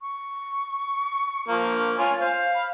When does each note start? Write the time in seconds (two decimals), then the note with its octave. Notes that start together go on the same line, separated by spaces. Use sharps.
0.02 C#6
1.48 F3 A#3
1.98 F4 C#5 G#5
2.19 C5 F5
2.54 B5